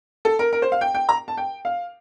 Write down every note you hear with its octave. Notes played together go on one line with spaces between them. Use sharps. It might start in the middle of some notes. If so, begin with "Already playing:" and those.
A4
A#4
A#4
C5
F5
G5
G5
A#5
A5
G5
F5